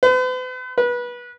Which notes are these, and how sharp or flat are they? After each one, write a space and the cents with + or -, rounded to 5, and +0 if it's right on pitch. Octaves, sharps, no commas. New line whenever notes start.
B4 +45
B4 -25